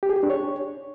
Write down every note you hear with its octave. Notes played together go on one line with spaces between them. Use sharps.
G4
G#4
G4
D4
C#5